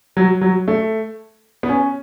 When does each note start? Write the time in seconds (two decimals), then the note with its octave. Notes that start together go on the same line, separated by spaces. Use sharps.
0.17 F#3
0.41 F#3
0.68 A3
1.63 B3
1.69 C#4